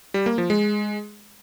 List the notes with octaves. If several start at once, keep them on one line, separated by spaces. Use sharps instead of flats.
G3
A#3
F3
G#3